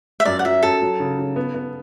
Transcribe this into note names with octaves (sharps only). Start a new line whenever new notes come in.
E5
F#2 D5
F#5
F#3 E5
F#2 A4
F#3
C#3
C#3
B3
B3